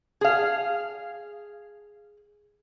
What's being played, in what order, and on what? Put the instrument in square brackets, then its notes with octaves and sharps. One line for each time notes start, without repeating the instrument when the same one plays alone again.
[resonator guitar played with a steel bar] G#4 F5